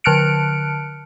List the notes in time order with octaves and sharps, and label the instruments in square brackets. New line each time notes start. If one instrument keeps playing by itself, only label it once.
[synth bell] D3 A5 F6 F#6 C#7 D7